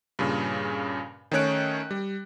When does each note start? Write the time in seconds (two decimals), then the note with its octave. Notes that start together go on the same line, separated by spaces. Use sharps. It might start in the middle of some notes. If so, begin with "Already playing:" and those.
0.19 G2 A#2 C#3
1.32 D#3 A3 C#4 C#5 F#6 D7
1.91 G3